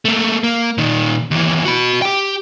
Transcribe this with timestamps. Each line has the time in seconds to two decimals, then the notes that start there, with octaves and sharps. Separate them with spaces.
0.05 A3 A#3
0.44 A#3
0.78 A#2 D#3
1.31 D#2 E3
1.65 F#4 B5
2.02 G4 G5